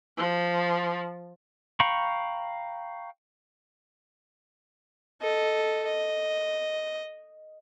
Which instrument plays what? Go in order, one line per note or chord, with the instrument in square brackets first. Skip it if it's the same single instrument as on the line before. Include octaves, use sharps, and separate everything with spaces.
[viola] F3
[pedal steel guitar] F5 G5 A#5 B5 C#6
[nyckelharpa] A4 D#5
D#5